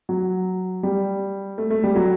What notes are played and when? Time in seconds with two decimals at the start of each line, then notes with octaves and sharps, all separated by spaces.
0.09 F#3
0.83 G3
1.58 A3
1.70 A3
1.84 G3
1.96 F#3